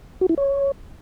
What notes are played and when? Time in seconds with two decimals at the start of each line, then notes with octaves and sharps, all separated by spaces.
0.21 F#4
0.29 E4
0.37 C#5